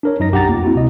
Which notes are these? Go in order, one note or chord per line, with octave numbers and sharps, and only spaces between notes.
D4 A#4 C#5
F#2 D#4 A#6
B1 G4 F#5 A#5 A6
F2 A#3 F4
C4 E4 F#4
C#2 C3 D#5